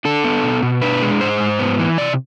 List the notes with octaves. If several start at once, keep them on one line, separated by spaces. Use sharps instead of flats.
D4 A4
B3
B2
B2
D4 B4
G#3
G#2 C5
G#2
B3
E3
C3 D5